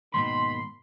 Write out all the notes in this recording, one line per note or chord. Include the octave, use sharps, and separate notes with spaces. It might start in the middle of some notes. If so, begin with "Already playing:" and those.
D#2 G#2 B2 D#3 B5 C6